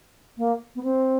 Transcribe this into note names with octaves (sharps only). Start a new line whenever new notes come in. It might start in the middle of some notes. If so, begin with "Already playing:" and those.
A#3
B3
C4